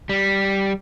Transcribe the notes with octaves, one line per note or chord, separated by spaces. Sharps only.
G3